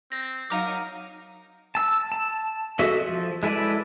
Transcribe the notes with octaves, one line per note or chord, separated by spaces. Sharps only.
C4 A#6
F#3 D#4 A#4 F5 A#5 D6
A5 E6
A5
F#4 G#4 A4 D#5 E5
F3
G#3 E4 A4 B4 D5